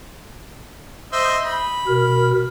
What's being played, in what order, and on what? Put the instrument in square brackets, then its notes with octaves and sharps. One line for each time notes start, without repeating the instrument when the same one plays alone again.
[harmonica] C5 D#5 E5
B5
[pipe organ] B2 A#4